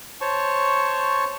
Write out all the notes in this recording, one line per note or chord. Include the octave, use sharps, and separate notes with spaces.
C5 C#5 A5 C#6